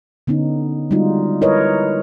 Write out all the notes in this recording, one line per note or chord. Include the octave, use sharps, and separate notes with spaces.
D3 B3 C#4 D#4
G3 G#3 D#4 F4 F#4
E4 A#4 B4 C#5 D#5